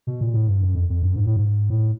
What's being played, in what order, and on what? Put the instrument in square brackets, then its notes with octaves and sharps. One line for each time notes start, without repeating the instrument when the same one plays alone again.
[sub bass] B2
A#2
A2
G2
F#2
F2
F2
F#2
G#2
A2
G#2
A2